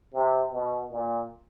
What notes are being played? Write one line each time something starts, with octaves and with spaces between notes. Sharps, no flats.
C3
B2
A#2